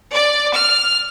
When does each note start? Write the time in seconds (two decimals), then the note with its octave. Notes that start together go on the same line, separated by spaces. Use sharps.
0.13 D5
0.54 F6